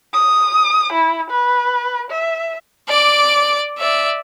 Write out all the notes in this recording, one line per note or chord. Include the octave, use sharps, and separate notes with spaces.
D#6
E4
B4
E5
D5 D6
D5 E5